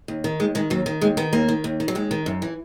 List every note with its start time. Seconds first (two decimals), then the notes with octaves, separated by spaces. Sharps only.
0.08 D#2
0.24 D#3
0.40 D#2 G#3
0.55 D#3 G#3
0.70 D#2 F#3
0.86 D#3
1.01 D#2 G#3
1.17 D#3 B3
1.33 D#2 A#3
1.49 D#3
1.64 D#2
1.80 D#3
1.88 F#3
1.95 D#2 G#3
2.11 D#3
2.26 F#2
2.42 E3